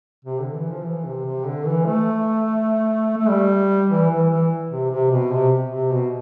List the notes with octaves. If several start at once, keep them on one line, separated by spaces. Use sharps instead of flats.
C3
D3
E3
F3
E3
C3
C3
D3
E3
A3
A3
G3
E3
E3
E3
C3
C3
B2
C3
C3
B2